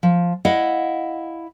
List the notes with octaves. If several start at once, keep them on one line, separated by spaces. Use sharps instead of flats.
F3
E4 D#5 F5 F#5